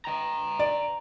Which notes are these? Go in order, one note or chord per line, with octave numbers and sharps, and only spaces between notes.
G5 A#5
D5